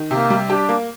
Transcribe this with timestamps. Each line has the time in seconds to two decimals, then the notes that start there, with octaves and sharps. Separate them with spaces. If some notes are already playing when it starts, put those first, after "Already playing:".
Already playing: D#3
0.11 C3 A#3
0.30 G3
0.49 D4 G4
0.69 A#3